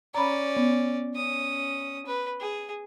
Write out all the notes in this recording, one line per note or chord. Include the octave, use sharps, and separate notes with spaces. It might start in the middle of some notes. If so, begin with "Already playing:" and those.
C#4 D5 A#5 B5
B3
C#4 D#6
B4
G#4